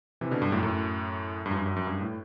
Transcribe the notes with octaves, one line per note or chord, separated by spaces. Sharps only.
C3 E3
B2 D3
G2
F#2 A2
F#2 A2
G2
F#2
G2
F#2
F#2
G2
A2